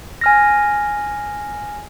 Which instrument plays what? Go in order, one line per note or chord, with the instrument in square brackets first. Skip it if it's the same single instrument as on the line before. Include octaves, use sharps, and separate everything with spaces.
[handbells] G#5 F6 A#6